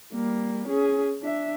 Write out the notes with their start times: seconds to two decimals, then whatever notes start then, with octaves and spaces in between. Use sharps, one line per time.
0.13 G3 A#3
0.69 C#4 G#4
1.22 D4 E5